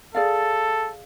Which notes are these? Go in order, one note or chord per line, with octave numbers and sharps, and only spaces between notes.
G#4 A4 D5 F5